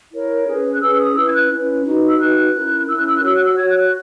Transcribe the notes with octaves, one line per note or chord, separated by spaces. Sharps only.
E4 A#4 C#5
C#4 G#4 B4
F#6
C#4 G#4 B4 E6
E6
D#6
C#4 E4 B4 E6
G#6
F#6
C#4 E4 B4
D#4 F#4 B4
E6
D#4 F#4 B4 F#6
C#4 E4 A#4
C#4 E4 A#4 E6
F#6
E6
F#6
F#4 C#5 E6
F#6
E6
F#4 C#5 G#6
F#6
F#6